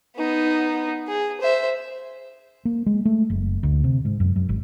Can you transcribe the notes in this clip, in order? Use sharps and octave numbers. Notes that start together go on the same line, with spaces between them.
B3 D#4
G#4
C5 E5
A#3
G#3
A3
F#1
D2
C3
G#2
F#2
F#2
G#1